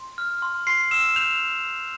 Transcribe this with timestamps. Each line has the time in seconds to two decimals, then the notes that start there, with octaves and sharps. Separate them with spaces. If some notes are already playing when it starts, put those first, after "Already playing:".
Already playing: C6
0.18 F6
0.42 C6
0.67 C6 C7
0.91 E6 E7
1.16 G6 F7